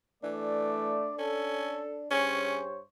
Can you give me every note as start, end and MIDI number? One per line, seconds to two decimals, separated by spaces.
0.23 0.96 52
0.23 1.12 57
0.23 2.07 62
0.23 1.12 74
1.19 1.85 61
1.19 2.01 69
2.11 2.81 43
2.11 2.60 61
2.11 2.67 68
2.11 2.81 72
2.11 2.81 73